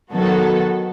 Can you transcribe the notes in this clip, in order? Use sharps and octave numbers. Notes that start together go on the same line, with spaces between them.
D#3 F#3 B3 F#4 A4